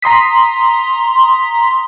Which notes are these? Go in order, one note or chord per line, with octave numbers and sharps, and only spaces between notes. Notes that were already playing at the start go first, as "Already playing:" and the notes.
A#5 C6 D#6 B6